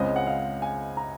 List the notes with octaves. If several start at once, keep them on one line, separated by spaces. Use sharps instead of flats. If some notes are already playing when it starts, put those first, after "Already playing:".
Already playing: C#2 C#3 G#3 C4 D#5
F#5
F5
G#5
A#5